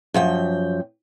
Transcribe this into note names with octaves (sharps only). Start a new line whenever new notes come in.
F#2 F3 G5